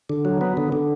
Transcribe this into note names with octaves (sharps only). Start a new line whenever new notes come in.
D3
F#3
B3
D3
D3